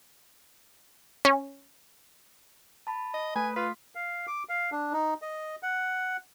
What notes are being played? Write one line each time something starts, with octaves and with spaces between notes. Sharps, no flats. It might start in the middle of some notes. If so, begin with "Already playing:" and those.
C#4
A5 B5
D#5
A3 B4 G#5
F4 B4 B6
F5
D6
F5
D4
D#4
D#5
F#5